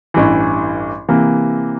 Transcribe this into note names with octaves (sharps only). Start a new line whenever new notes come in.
A1 G2 E3
C3 E3 A#3